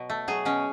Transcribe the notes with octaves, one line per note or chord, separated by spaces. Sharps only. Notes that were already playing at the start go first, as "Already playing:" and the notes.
Already playing: B2 F#3
A3
F#3 G#4
B2 C#4